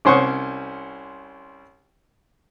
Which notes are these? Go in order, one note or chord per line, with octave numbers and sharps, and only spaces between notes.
C2 C#4 C5 F#5 C#6 D#6